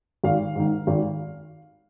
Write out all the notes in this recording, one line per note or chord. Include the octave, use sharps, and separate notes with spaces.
G#1 F5
G#2 D#3
G#1